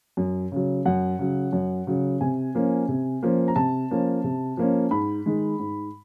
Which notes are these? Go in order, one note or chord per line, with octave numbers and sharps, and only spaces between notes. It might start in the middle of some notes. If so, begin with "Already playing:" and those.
F#2
C#3 F#3
F#2 F#5
C#3 F#3
F#2
C#3 F#3
C3 G#5
F3 A#3 C#4
C3
F3 A#3 C#4
A#5
C3 A5
F3 A#3 C#4
C3
F3 A#3 C#4
G#2 B5
D#3 G#3
G#2